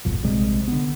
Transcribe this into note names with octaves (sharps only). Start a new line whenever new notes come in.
D1 G#1 F2 B2
A#1 C3 G3 G#3
D3 B3